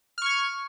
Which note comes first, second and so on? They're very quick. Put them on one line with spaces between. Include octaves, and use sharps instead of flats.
F6 C#6 G#6